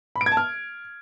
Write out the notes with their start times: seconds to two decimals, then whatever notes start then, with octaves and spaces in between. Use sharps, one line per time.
0.16 B5
0.21 D7
0.26 G#6
0.32 A5
0.37 F6